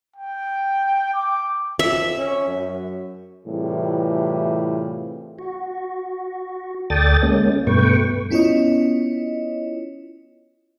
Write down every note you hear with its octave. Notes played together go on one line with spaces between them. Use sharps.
G5
D6
F2 E5
C#4
F#2
A2 C3 E3 G3 F4 G#4
F#4
D2 A4 D5 G5 D#6 A6
G#3 A#3 C#4
G2 B2 A3 B4 G5 C#6
B3 C#4 E4 F4 C#5 D#5